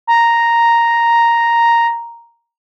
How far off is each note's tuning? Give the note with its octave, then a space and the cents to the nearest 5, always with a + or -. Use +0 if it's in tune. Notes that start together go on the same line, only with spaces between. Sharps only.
A#5 +0